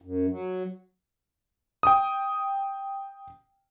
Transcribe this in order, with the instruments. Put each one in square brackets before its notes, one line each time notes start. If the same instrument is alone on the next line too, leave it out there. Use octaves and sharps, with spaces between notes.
[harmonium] F#2
F#3
[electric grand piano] G5 D#6